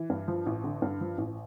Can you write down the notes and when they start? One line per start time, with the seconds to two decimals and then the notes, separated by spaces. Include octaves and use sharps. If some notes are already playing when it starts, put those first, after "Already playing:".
Already playing: E3
0.10 G2
0.28 F3
0.46 A1
0.64 D3
0.82 G2
1.01 F3
1.18 A1